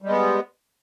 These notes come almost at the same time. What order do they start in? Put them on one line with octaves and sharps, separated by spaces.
G3 G#3 B3